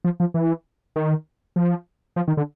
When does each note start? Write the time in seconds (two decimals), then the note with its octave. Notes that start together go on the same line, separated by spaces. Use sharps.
0.04 F3
0.20 F3
0.34 E3
0.96 D#3
1.56 F3
2.16 F3
2.28 D#3
2.37 D3